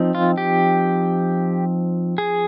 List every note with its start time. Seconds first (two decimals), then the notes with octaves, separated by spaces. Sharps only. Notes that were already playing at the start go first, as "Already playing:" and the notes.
Already playing: F3 C4 D#4
0.15 F4
0.37 G4
2.18 G#4